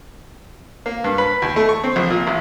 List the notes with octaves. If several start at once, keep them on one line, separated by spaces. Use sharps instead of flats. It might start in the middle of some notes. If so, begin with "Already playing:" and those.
A#3
G2
B4
D#2
A3
C#6
C4
A#1
A#2
A1